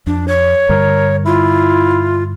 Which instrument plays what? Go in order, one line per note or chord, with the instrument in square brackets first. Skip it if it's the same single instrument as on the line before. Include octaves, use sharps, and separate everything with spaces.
[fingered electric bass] F2 [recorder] D4
[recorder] C#5
[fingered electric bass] G2 D3 G3 [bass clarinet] A#4
[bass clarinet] E4 [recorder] F4